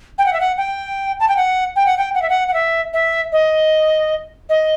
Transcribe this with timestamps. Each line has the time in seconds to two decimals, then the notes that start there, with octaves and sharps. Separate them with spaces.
0.18 G5
0.26 F#5
0.33 E5
0.40 F#5
0.57 G5
1.20 A5
1.28 G5
1.37 F#5
1.76 G5
1.86 F#5
1.98 G5
2.15 F#5
2.22 E5
2.29 F#5
2.48 F#5
2.54 E5
2.93 E5
3.32 D#5
4.49 D#5